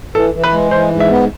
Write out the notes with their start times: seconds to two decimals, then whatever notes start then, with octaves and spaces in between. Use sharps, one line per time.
0.15 E3 A4
0.34 E3
0.44 B4
0.53 G#3
0.71 E3 C5
0.91 G#2
1.00 E5
1.10 B3